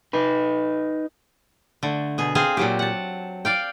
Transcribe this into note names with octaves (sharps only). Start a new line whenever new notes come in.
D#4 B4
D3 A3
B2 G#4
C4 G#4 F5
A#2 F#3 G4
F#5 A5
D5 F5 G5